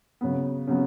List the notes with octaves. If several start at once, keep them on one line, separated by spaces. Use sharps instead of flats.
C#3 F#3 B3
C#3 F#3 B3